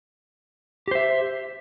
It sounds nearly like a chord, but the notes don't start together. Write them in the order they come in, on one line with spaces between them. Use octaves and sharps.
G4 C5 E5